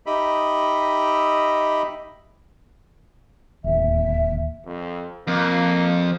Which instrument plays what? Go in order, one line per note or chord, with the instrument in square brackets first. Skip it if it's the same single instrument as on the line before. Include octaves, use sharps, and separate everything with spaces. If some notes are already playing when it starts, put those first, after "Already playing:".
[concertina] D#4 G4 D#5 E5 B5
[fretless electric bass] D1 D#2 [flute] E5
[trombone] F2
[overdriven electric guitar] F2 [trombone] A#3